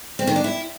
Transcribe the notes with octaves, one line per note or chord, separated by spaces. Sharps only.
C4
D#3
D4
E4